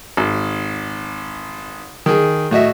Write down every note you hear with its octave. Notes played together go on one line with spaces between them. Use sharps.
G#1
D#3 G#4
A2 F#4 D#5 E5